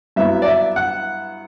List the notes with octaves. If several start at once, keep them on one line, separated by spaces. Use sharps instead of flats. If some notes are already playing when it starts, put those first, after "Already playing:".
G2 F#3 B3 E4 E5
D5
E5
F#5